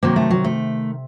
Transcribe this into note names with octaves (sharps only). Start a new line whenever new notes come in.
C3 D#3 F#3 A#3
A3
F#3
A3